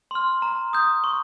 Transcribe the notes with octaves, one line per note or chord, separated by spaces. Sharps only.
C6 F6
A#5
D#6 G6
C#6